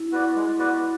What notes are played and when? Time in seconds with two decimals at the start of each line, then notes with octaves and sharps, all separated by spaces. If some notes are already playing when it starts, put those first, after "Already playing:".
Already playing: E4
0.11 B3 F#4 B4 D5
0.36 G#3
0.58 B3 F#4 B4 D5